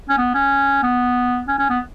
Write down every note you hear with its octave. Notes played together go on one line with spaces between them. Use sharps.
C#4
B3
C#4
B3
C#4
C#4
B3